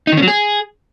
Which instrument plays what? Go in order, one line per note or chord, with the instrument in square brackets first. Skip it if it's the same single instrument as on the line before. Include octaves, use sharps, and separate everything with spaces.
[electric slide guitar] D#4
D#3
C#4
F#3
G#4